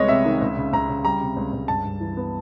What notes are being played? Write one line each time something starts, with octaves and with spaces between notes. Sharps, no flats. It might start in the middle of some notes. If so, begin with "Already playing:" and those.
Already playing: C2 G#3 B3 C#5 D#5
C3 E5
D#3
C#2
C#3
C#2 A#5
C#3
G3 A#5
C3
C#2
C#2
G2 A5
G2
E3
B3